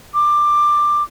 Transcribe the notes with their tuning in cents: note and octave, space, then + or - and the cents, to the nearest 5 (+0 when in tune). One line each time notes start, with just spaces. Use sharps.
D6 +15